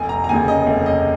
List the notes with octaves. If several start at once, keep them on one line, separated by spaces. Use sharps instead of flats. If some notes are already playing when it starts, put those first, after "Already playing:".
Already playing: F1 G#5
A#5
A#5
D#2 C#3 G#5
D#5
F1
D#5